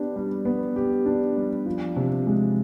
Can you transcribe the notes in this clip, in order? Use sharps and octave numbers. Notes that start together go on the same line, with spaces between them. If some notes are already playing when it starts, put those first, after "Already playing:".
Already playing: B3 D4 G4
G3
B3
G4
D4
G3
F3
C3
G#3